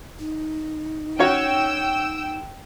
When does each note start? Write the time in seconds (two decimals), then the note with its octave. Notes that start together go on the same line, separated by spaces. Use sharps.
0.20 D#4
1.19 C#4 F#4 C#5 G5 E6